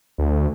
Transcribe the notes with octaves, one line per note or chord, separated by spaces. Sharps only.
D2